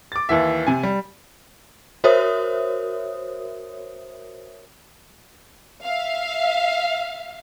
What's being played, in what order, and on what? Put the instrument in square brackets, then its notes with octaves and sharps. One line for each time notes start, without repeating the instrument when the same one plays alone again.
[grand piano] D6 A6
D#2 E3 E5
C3 G#5
G3
[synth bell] F#4 A#4 C5 C#5 E5 D#6
[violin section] E5 F5